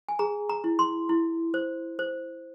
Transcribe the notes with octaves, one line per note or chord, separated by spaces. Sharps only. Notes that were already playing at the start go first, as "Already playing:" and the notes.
G#5
G#4 A#5
A#5
E4
C6
E4
C5
C5